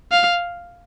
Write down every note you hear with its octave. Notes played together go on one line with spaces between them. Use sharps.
F5